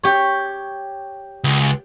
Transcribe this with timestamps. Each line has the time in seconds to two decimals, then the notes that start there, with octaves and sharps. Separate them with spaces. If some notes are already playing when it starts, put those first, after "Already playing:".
0.03 G4 C#5
1.44 C#2